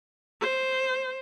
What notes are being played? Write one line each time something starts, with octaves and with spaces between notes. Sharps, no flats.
C5